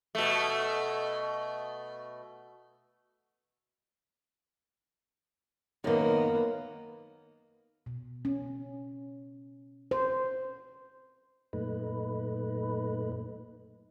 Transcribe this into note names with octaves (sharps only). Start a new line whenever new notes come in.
B2 A3
F#2 D#3 A#3 B3
B2
C#4
C5
F#2 A#2 A3 D#4 B4